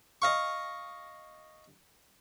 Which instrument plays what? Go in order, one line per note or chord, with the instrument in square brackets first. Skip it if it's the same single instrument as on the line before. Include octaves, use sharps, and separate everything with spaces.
[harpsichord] D#5 F5 C#6